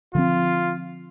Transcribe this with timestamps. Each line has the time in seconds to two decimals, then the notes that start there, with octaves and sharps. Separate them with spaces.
0.15 D3 F3 C4 F4